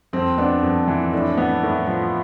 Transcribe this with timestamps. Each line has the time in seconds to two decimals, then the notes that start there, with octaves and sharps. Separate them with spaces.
0.13 F2 C4
0.38 B3 D4
0.63 F2
0.88 E3
1.13 A2 D4
1.37 B3
1.63 A2
1.87 F3